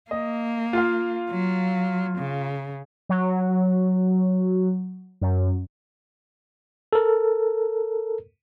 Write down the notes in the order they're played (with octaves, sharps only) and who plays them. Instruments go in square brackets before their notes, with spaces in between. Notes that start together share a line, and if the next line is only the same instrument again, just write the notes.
[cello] A#3 [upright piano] D#5
[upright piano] F4 F5
[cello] F#3
C#3
[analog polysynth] F#3
F#2
[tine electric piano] A4 A#4